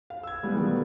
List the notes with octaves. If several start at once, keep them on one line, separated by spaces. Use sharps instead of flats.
F5
E6 G#6
E3 G3 G#3 B3
B2 D#3 G3 A3 B3